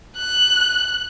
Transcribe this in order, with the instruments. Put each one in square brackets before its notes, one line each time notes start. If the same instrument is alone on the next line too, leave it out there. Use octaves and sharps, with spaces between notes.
[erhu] F#6